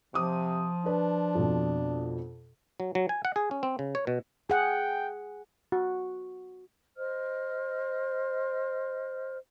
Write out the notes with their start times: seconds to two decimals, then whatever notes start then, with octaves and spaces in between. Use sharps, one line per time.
0.14 C3 F3 D6 D#6
0.86 D4 B4
1.35 F2 B2
2.80 F#3
2.95 F#3
3.09 G#5
3.25 F#5
3.36 G#4
3.51 C#4
3.63 C4
3.79 C#3
3.95 C#5
4.07 B2
4.50 G#4 F#5 G5
5.72 F#4
6.97 C5 D#5 F6